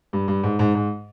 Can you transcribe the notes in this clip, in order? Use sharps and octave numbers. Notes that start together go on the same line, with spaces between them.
G2
G2
G#2
G#2
G#2